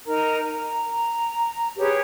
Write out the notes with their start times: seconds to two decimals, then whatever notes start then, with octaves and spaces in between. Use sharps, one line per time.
0.07 D#4 A#4 A#5
0.61 A#5
1.76 G4 G#4 B4 C#5